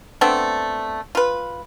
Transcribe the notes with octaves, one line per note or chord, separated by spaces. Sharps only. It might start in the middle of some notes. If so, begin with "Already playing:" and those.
A3 B3 C4 D4
F4 B4